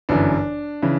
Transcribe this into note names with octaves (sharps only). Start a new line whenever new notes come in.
G1 F#2 E3 D4
C#3 E3